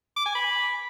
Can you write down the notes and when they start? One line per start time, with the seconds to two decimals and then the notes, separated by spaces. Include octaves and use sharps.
0.17 D6
0.26 G#5
0.35 B5